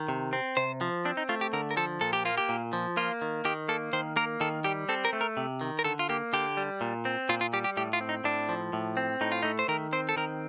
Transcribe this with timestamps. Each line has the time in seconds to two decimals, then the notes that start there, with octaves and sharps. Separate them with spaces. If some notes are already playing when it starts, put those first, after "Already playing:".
Already playing: D#3
0.08 C3
0.33 C4
0.57 C3 C5
0.81 F3
1.05 C4 D4
1.17 D#4
1.29 A3 F4
1.41 G4
1.53 D3 A#4
1.71 A#4
1.77 F3 A4
2.01 A#2 A4
2.13 G4
2.25 A#3 F4
2.38 G4
2.49 A#2
2.73 F3
2.97 A#3 F4
3.22 D#3
3.45 D#3 G4
3.69 A#3 A4
3.93 D#3 C5
4.16 A#3 A#4
4.41 D#3 A4
4.64 G3 G4
4.89 C4 A4
5.05 A#4
5.13 A3
5.21 A#4
5.37 C3
5.61 D#3
5.79 A#4
5.84 D3 A4
5.99 F4
6.09 A#3 G4
6.33 D3 G4
6.57 G3
6.81 A#2
7.05 C4
7.29 A#2 F4
7.41 F4
7.53 G3 G4
7.64 G4
7.77 A2 G4
7.93 F4
8.01 C4
8.09 D#4
8.24 A2 D4
8.49 F3
8.73 A2
8.97 C4
9.21 A2 D#4
9.32 F4
9.43 A3 D#4
9.59 C5
9.68 D#3 A#4
9.93 C4 C5
10.09 A4
10.17 D#3 A#4